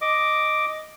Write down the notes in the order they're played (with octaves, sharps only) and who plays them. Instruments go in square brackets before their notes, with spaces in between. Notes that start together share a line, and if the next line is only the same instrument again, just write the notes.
[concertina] D#5 D6